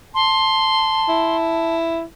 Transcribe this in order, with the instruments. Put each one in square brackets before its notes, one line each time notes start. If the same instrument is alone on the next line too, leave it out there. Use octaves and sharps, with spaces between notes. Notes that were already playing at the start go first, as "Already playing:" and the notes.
[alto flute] A5 [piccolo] C6
[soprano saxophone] E4